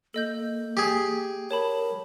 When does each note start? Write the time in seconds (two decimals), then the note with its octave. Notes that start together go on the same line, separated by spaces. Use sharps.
0.14 A#3 A4 D#5 G6
0.77 G4 G#4
1.51 A#4 C#5 A5 B5